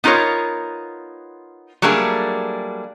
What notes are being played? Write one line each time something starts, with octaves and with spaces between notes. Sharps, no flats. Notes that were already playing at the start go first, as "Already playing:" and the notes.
B3 D#4 F4 A#4 C#5
F#3 G3 A3 A#3 D4 G#4